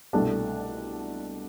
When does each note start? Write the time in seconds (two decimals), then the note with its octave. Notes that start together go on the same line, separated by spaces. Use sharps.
0.13 C2 B2 A3 D4